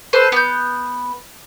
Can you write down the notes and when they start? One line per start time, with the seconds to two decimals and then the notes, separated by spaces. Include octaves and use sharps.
0.13 A4 B4 C5
0.32 B3 G6